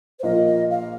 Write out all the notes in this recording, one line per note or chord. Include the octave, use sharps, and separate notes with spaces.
C5
A#1 A#2 A#3 F4 D#5
F5